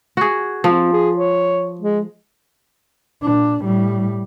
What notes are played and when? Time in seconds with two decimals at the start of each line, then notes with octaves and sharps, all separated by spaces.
0.17 F#4 G#4
0.64 F3 C4
0.93 G#4
1.16 C#5
1.80 G#3
3.22 A#2 D4
3.63 A2 G3